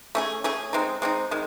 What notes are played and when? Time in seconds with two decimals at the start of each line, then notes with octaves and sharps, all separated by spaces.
0.15 A3 C#4 G#4
0.44 A3 C#4 G#4
0.73 G#3 C4 D#4
1.02 G#3 C4 D#4
1.31 D#3 G#3